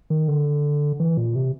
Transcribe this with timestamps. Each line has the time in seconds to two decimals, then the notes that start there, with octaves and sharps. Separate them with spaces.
0.10 D#3
0.28 D3
1.00 E3
1.17 A#2
1.35 C3